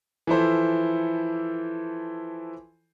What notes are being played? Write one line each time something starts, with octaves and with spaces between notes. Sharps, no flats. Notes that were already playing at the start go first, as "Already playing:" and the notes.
E3 F3 E4 A4 C5